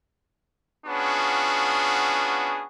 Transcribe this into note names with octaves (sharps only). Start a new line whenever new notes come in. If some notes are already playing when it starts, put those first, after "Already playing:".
B3 C#4 D4 F4 F#4 G#4